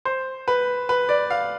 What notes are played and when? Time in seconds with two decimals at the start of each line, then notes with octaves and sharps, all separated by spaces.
0.05 C5
0.48 B4
0.89 B4
1.09 D5
1.30 F5